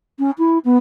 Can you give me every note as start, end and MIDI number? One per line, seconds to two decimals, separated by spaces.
0.19 0.30 61
0.38 0.58 64
0.65 0.77 59